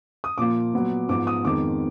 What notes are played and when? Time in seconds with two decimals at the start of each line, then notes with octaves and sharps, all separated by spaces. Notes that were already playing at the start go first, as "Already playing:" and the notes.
0.24 D#6
0.38 A#2 F3 A#3 D6
0.74 A#2 F#3 B3
1.09 G#2 F3 B3 D6
1.27 D#6
1.44 F2 D#3 G#3 B3 D6